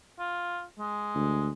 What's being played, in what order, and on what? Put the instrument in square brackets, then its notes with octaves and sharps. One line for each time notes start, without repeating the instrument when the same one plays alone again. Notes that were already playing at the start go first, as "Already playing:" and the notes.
[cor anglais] F4
G#3
[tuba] D2